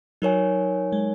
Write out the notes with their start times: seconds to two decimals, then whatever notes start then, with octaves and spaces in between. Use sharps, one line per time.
0.22 F#3 D#4 A#4 C#5 G#5
0.92 G#3